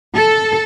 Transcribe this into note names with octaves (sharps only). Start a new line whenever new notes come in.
A4